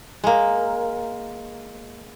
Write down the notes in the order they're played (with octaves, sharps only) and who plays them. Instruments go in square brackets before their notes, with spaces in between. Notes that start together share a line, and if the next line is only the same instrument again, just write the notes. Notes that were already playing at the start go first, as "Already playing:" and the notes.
[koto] G#3 A#3